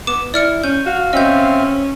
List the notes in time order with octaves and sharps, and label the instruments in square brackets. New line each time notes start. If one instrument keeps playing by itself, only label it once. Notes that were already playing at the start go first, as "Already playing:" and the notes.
[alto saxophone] B3 [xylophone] D6 E7
[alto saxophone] E4 [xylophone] D5 F6 C#7
[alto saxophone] C#4 [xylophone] G6
[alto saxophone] F#4 [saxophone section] F5
[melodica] C4 E5 [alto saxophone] C#4 [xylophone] D#5 G6